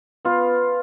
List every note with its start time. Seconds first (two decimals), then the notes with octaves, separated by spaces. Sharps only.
0.25 B3 F4